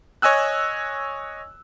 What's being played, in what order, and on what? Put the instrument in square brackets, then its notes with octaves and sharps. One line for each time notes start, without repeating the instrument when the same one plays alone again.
[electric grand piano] C#5 D#5 G#5 E6 F#6